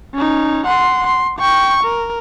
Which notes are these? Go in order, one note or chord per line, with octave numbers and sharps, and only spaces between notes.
C#4 D#4
F#5 C6
C6
G5 C#6
A#4